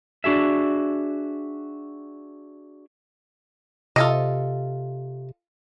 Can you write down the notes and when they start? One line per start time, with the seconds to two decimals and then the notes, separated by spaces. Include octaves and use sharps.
0.24 D4 F#4 G#4 E5
3.96 C3 F4 A4 D#5